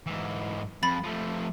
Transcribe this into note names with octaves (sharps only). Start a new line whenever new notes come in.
G#2 E3
F2 B5 A6
F3 A3